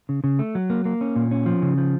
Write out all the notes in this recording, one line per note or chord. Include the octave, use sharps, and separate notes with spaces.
C#3
C#3
A3
F#3
A#3
A#3
C#4
A#2
C#4
F3
C#3
F3